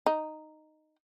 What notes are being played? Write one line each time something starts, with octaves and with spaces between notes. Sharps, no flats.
D#4